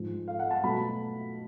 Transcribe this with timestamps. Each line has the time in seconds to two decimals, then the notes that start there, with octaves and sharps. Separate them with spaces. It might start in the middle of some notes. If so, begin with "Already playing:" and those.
Already playing: G#2 F3 G#3
0.28 F5
0.39 F#5
0.51 A5
0.63 B2 F#3 A3 B5